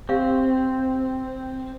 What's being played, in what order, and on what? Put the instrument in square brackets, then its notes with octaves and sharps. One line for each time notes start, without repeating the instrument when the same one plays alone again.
[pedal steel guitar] C4 [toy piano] G4 F5